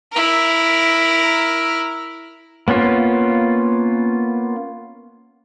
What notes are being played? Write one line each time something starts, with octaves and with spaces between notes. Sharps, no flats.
E4 A#4
A#3 B3 C#4 F4